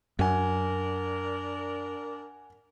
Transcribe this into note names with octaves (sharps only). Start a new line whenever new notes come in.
F#2 D4 A#4 F#5 G#5